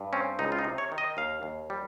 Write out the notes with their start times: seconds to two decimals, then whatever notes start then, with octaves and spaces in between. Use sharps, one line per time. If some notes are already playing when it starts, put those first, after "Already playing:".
Already playing: G2
0.13 C4 C#4
0.39 C#2 D#4
0.52 F4
0.59 D#4
0.64 C3
0.78 C#5
0.92 D#3
0.98 D#5
1.17 D#2 F5
1.43 D#2
1.70 G3